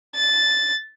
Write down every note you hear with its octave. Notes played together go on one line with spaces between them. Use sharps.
A6